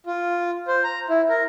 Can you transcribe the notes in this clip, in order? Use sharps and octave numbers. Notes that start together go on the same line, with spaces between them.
F4
C5
A#5
E4
A#4